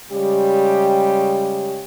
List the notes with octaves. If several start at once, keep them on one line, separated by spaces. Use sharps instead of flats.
C#3 G3 G#3 G4